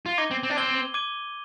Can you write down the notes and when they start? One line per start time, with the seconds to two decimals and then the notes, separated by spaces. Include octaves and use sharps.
0.06 F4
0.18 D#4 D6 G#6 D#7 G7
0.31 C4
0.43 C4
0.50 D4
0.56 C4 D6 G#6 D#7 G7
0.94 D6 G#6 D#7 G7